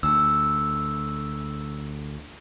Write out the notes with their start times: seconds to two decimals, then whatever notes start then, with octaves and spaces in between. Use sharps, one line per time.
0.03 D2 E6